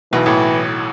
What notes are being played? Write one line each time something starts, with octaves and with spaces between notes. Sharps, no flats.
B1 B2 E3
A1 A2